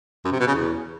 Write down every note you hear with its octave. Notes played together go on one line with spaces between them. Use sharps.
F#2
C3
B2
C#3
E2